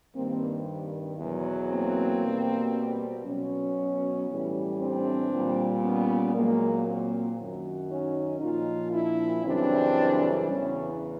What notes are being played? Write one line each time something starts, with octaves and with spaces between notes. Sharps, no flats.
G2 D#3 G3 A#3 C4
E2 B2 F#3
A#3 C4
B2 G3
B2 F#3 B3 C#4
A2 E3 G3
C4 D4
A#2 G3
B3 C#4
A#2 F#3 G#3 A#3
A#3 C4
F#2 D#3 F#3
C#4 D#4
A#2 F3 D#4 F4
D4 E4
F#2 C#3 E3 G3 C4 D4
E2 C#3 E3 B3 C#4